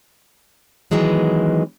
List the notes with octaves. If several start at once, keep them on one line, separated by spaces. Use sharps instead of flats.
D#3 E3 F#3 G#3 B3